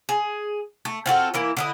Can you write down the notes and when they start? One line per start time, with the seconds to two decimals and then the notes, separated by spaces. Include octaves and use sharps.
0.09 G#4
0.85 A3
1.06 C4 F4 F#4 A4
1.34 E3 A#3 E4
1.57 D3 E4 D#5